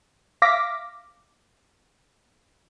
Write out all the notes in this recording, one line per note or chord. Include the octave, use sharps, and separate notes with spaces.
E5 F5 D6 A#6 B6